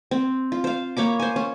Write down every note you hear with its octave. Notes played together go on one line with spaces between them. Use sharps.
C4
F4
C5 F5
A#3 C#5 B5 D6
C5 G#5
C#4